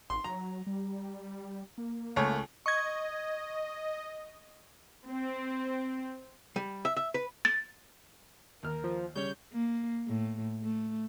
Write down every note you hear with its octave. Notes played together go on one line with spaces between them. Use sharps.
G#1 C6
F#3 A#5
G3
A#3
C#2 A3 C#5
D#5 C#6 G#6
C4
G3
E5
E5
B4
A6
D#2 A#4 F6
F3
C#3 G3 C#5 G6
A#3
A2
A3